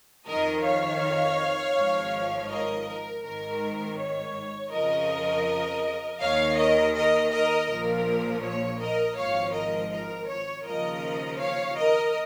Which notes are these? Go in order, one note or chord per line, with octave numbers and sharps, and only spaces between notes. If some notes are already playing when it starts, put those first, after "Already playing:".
F2 D#3 A#4 D#5
C#5 F5
G#1 G#2 F3
A#4 D#5
A#4
G#1 G#2 D#3 A#4
C#5
F2 C#3 F3 A#4 D#5
D#2 D#3 C#5 F5
A#4 D#5
A#4 D#5
A#4 D#5
A#1 A#2 F3 A#4
C#5
A#4 D#5
G#1 G#2 F3 C#5 F5
A#4 D#5
A#4
C#5
D#2 C#3 F3 A#4 D#5
C#5 F5
A#4 D#5